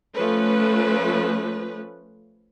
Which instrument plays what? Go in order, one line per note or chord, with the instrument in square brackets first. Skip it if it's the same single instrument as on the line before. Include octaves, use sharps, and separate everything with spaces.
[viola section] F3 A3 C#4 B4